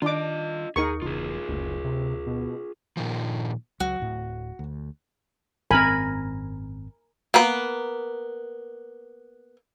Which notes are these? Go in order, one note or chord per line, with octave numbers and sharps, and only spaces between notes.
D#3 D4 F4 D#5 D6
D#2 D#4 G#4 A#4 C#6
E1 C#2 F4 G#4
F#1 D2
C3
B2
A#2 D#3 F3
C#2 F#3 F#4
D1 A2
D2
G#1 F#2 C4 A#4 G#5 B5
A#3 B3 B4